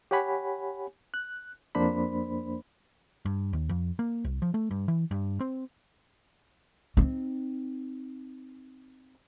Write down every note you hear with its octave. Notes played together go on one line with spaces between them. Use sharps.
G4 C#5 F#5 G#5 B5
F#6
F2 A#3 D4 C5 B5
G2
D#2
F2
A#3
C2
F3
A3
G2
E3
G2
C4
C4 D#4